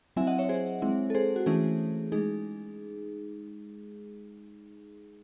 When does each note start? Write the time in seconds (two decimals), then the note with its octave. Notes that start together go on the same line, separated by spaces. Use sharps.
0.16 F#3 C4 E4 E5 G#5
0.27 D#5 F#5
0.38 C#5 E5
0.49 G#4 C5
0.82 G#3 C4 E4
1.10 A4
1.15 G#4 C5
1.36 F#4
1.46 E3 A3 C#4 E4 G#4
2.12 G#3 D#4 G#4